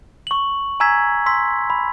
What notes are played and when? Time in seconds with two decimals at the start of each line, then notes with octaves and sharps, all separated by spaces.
0.27 C#6 F#7
0.80 G#5 A#5 E6 G#6 B6
1.26 C6 E6 B6
1.70 B5